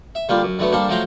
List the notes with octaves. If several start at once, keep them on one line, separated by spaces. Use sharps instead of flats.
E5
D3 G3 A#3 F4 G4
F#2
D3 F#3 A3 B3
G3 A#3 D4 A4 C5
F3 F#3 A3 G5 A#5 C6